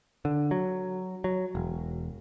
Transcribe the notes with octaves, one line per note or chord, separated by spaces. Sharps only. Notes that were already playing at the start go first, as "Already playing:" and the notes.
D3
F#3
F#3
E1